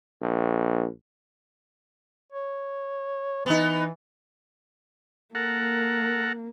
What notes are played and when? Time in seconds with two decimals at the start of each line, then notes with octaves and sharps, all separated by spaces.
0.22 A#1
2.32 C#5
3.46 E3 B3 D#4
5.35 A#3 A4 A#4 F#5